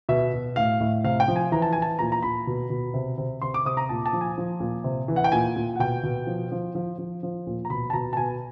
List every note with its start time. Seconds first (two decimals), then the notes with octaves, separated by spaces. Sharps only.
0.09 B2 E5
0.33 B2
0.56 A2 F5
0.80 A2
1.04 C3 F5
1.20 G5
1.28 F3
1.36 G#5
1.52 E3 A#5
1.62 A5
1.73 E3 G#5
1.82 A5
1.99 A#2 A#5
2.12 A#5
2.22 A#2 B5
2.47 B2
2.70 B2
2.94 C3
3.18 C3
3.42 C3 C6
3.54 D6
3.65 C3 D#6
3.77 A#5
3.89 A#2 A5
4.06 A5
4.13 F3
4.21 G#5
4.38 F3
4.60 A#2
4.84 C3
5.08 E3
5.16 F#5
5.24 G5
5.32 A#2 G#5
5.56 A#2
5.76 F#5
5.79 B2 G5
6.03 B2
6.27 F3
6.52 F3
6.75 F3
6.98 F3
7.23 F3
7.47 A#2
7.65 A#5
7.70 B2 B5
7.90 A5
7.93 B2 A#5
8.13 A5
8.17 B2 G#5